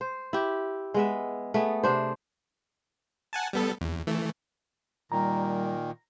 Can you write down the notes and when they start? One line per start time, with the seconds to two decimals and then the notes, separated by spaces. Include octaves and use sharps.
0.01 C5
0.33 E4 G4
0.94 G#3 B3 E5
1.54 A3 B3 G#4
1.83 C3 D4 C5
3.33 F#5 G#5 A5
3.53 G3 B3 A4
3.81 E2
4.07 E3 A3
5.12 A#2 D#3 G3 A#5